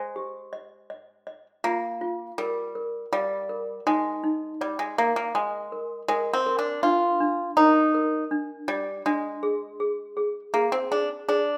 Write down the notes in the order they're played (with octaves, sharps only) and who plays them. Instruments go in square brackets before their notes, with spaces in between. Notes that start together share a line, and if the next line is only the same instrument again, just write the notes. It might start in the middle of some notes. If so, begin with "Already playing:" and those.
Already playing: [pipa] G#3 [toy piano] C5
[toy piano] G4
D#5
D#5
D#5
[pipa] A#3 [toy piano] F4
[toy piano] F4
[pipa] G3 [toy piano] A#4
[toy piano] A#4
[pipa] G3 [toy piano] F5
[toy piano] A#4
[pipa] G#3 [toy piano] D#4
[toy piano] D#4
[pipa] G3 [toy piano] D5
[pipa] G#3
[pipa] A#3 [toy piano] A#4
[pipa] A#3
[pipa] G#3 [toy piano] D#5
[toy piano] A#4
[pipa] G#3 [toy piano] A#4
[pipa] C4
[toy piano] A#4
[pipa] D4
[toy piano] D4 [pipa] F4
[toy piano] D4
[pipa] D#4 [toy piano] A#4
[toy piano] A#4
D4
[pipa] G3 [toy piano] D5
[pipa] G#3 [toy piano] D4
[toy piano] G#4
G#4
G#4
[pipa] A#3 [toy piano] G#4
[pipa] C4
[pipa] D4 [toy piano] G#4
[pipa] D4 [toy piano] G#4